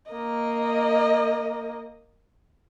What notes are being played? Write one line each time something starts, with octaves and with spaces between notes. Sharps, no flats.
A#3 D#5